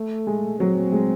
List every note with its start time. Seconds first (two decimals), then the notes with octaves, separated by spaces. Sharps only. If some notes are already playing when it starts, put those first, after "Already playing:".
Already playing: A3
0.27 G#3
0.59 F#3 C4
0.92 G#3